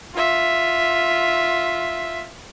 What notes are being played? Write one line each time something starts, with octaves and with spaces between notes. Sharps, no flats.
F4 E5